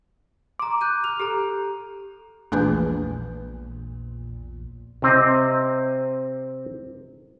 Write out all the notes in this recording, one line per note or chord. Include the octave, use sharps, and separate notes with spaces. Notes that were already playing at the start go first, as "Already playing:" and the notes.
A#5 C6 D6
F#6 G6 D#7
F6 F7
G4 A4 A#5
A#1 E2 A#2 G#3 A3 D4 G#4 B4
C3 C4 D#5